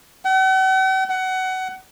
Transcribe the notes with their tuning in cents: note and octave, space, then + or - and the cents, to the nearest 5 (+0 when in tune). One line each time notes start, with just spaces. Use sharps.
F#5 +45
F#5 +20